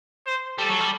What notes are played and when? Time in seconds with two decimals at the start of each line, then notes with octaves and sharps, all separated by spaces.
0.26 C5
0.58 G3 A4
0.69 F#3
0.80 G3